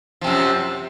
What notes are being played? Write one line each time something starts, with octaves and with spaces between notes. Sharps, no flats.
F#2 C3 F3